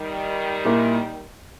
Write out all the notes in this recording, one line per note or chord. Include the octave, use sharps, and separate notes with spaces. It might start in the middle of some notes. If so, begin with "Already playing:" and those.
Already playing: D#3 G3
A#2 A#3 E4